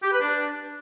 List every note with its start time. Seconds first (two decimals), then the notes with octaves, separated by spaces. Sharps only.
0.03 G4
0.12 B4
0.21 D4